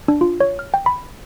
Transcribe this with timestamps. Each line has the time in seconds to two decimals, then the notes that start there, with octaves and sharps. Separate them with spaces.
0.08 D4
0.21 F4
0.40 C#5
0.59 F6
0.74 G5
0.86 B5